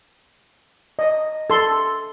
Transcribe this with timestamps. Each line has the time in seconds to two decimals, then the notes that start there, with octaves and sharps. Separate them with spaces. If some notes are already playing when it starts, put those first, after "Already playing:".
0.99 D#5
1.50 A4 C6